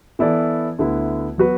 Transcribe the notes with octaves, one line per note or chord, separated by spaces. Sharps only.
E3 B3 E4 A4 D5
D2 D3 B3 E4
F#3 B3 F#4 B4